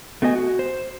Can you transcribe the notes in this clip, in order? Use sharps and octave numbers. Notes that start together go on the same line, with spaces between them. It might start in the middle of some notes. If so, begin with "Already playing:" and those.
A3 B3 F#4 D#5 G#5
F#4
C5